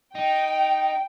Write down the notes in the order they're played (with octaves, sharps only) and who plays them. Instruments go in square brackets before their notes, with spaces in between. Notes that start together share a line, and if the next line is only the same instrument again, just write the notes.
[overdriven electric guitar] D#4 [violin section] G5